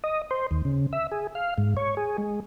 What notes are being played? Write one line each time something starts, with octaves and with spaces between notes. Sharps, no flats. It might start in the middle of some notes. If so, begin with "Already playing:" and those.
D#5
C5
D#2
C#3
E5
G#4
F5
G#2
C#5
G#4
G#3